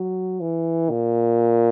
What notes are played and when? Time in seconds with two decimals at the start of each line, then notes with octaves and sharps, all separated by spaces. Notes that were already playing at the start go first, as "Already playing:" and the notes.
Already playing: F#3
0.40 E3
0.90 A#2